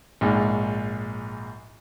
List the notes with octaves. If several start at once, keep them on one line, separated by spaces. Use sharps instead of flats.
A#1 G#2